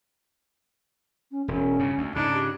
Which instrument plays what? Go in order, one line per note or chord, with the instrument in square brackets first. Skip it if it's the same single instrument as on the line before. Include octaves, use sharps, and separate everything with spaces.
[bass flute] C#4
[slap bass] E1 [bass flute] C#4
[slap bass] G2 C#3
D2
[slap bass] G#2 C#3 [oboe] D4 [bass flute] D#4
[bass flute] G4